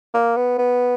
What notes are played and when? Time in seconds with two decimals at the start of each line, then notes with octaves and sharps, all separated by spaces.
0.14 A#3
0.37 B3
0.58 B3